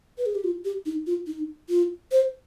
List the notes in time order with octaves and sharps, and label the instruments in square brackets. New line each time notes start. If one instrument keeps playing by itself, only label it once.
[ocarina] B4
G#4
G4
F4
G4
D#4
F4
D#4
F4
C5